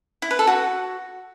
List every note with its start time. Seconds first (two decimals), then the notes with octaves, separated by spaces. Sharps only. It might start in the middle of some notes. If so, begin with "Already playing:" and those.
0.22 E4
0.31 B4
0.39 A4
0.47 F#4